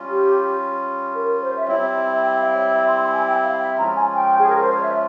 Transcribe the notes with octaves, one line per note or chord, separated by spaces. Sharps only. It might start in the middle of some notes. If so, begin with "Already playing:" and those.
Already playing: G3 C#4 F4
G4
A#4
C5
E5
G3 C4 E4 C#5
E5
E5
G5
E5
F5
C#5
E5
C6
C6
G#5
G5
F5
E5
F3 G#3 C#4 F4 A#5
G#5
G5
G#4
A#4
C5
C#5
E5